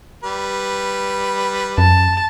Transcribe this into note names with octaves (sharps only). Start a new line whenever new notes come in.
G3 B4
F#2 A5